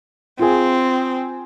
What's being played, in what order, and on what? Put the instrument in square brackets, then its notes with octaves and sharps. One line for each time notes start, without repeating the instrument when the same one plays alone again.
[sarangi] C4 [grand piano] F4 G#4